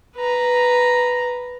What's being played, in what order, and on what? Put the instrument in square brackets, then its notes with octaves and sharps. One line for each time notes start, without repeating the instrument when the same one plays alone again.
[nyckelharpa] B4 A#5